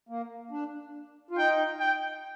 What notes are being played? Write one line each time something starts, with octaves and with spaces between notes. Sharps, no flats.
A#3
D4
F4
D#4 G5
G5